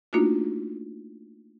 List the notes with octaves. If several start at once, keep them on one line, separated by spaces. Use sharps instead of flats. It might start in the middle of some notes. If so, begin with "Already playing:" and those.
A3 A#3 D4 D#4 F4 F#4